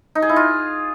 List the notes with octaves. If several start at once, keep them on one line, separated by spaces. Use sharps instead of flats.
D#4
G#4
E4
F4